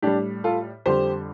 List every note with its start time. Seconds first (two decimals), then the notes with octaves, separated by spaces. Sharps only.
0.02 A2 G3 D4 G4
0.44 F4 A4
0.86 F2 D3 G3 G4 C5